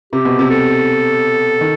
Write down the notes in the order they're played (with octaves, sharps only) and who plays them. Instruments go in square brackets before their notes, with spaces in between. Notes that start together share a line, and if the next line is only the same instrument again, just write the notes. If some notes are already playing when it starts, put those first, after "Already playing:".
[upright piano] C3 [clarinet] G4
[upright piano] B2
C3
[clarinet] A4
[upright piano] D#3